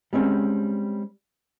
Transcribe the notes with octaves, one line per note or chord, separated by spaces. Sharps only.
G3 G#3 C4 C#4